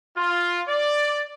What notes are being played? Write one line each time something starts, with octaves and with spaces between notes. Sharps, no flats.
F4
D5